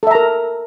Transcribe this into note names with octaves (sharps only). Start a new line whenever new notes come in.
A4 A#4 E5 A#5